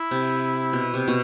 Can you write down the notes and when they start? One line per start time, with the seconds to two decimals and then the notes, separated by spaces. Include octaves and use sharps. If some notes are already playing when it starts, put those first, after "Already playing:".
Already playing: E4
0.11 C3
0.73 B2
0.94 C3
1.08 B2